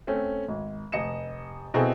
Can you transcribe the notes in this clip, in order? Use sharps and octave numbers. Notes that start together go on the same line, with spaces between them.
A3 C4 C#4
G#1
F1 D#5 C#7 E7
B2 B3 C4 E4 G#4 A4